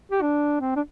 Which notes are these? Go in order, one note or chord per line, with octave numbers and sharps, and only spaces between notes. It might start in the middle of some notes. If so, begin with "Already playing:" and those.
G4
D4
C4
D4